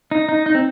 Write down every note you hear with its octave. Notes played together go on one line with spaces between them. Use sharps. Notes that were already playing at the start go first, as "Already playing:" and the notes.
D#4
D#4
D#4
C4